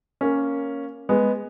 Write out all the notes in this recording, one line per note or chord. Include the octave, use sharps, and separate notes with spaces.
A#3 C#4
G#3 B3